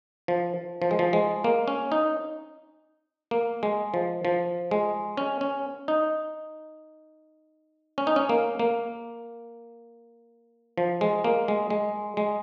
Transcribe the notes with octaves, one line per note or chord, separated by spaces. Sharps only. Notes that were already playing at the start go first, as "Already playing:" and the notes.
F3
F3
G#3
F3
G#3
A#3
C#4
D#4
A#3
G#3
F3
F3
G#3
C#4
C#4
D#4
C#4
D#4
C#4
A#3
A#3
F3
G#3
A#3
G#3
G#3
G#3